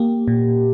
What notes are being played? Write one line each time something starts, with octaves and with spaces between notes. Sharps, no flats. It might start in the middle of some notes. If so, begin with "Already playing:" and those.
Already playing: A#3 G4
A#2